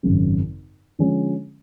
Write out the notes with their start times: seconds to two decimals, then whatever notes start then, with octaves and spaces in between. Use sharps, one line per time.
0.03 G#1 F#2 C#3
0.99 D3 F3 G#3 C#4